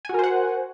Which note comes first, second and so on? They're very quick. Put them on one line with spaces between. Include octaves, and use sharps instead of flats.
G#5 F#4 A#4 C5 F#5